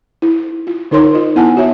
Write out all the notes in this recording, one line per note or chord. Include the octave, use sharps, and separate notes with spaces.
E4
F4
D3 D#4 A#4 C#5 C6
F4 D#5
B3 E4 F#5 G#5 A5
F#4 C#5 E5